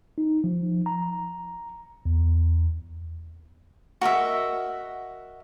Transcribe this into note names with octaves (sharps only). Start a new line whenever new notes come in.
D#4
F3
A#5
E2
F#4 A#4 D#5 E5